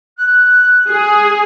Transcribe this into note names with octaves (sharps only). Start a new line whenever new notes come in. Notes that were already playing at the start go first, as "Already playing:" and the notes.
F#6
G#4